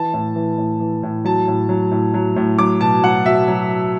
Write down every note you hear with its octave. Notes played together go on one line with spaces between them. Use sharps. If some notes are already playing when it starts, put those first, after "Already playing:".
Already playing: E3 A5
A2
E3
A2
E3
A2
F#3 A5
A2
F#3
A2
F#3
A2
F#3 D6
B2 A5
F#3 F#5
B2 E5
F#3